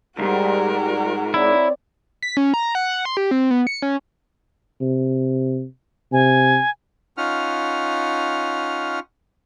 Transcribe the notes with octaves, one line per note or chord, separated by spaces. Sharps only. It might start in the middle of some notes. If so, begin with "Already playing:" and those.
B1 G#2 G3 F#4 A#4
C4 E4 C#5 D5
B6
C#4
A#5
F#5
C6
G4
C4
B3
C#7
C#4
C3
C3 G#5
C#4 D#4 F4 F#5 F6